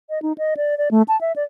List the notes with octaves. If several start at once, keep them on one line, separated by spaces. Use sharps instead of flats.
D#5
D#4
D#5
D5
D5
A3
A5
E5
D5